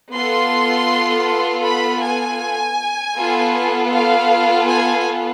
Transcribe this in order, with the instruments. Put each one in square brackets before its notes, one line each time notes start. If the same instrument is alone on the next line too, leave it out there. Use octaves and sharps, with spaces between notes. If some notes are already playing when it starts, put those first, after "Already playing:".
[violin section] B3 F4 A4 C6
B5
G#5
B3 F4 A4
F5
G#5